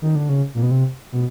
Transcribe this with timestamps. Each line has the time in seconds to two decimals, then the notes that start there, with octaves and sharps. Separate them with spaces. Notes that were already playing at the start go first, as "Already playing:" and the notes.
0.02 D#3
0.15 D3
0.29 C#3
0.54 A#2
0.63 B2
0.71 C3
1.12 B2